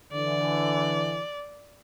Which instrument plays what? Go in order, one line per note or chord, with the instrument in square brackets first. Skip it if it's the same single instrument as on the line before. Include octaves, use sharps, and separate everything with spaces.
[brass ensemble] D3 E3 [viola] D5